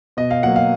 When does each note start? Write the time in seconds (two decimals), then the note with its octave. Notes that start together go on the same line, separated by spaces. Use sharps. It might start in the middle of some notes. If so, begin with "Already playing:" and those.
0.17 B2 D#5
0.31 F5
0.43 F#3 A#3 F#5
0.56 F5